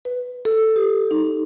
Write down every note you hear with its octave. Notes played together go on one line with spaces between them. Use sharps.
B4
A4
G4
D#4